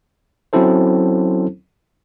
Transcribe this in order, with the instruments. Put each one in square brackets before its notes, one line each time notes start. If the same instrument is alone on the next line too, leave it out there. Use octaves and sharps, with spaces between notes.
[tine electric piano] F#3 C4 C#4 E4 A4 C5